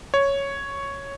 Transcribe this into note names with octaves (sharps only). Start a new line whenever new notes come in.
C#5